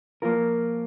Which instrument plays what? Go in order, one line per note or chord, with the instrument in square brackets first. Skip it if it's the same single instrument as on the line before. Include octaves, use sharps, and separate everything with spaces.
[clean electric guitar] F3 A#3 F4 A#4